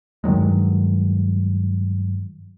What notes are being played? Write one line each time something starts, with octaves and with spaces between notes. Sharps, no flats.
G2 D#3 F#3 G#3